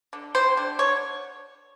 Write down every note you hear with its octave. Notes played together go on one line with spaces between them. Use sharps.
D3
G3 C5
D3
D3 C#5